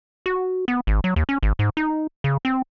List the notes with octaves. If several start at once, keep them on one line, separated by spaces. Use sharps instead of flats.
F#4
B3
G#1
F#3
D#2
C#4
G#1
G#2
D#4
C#3
C4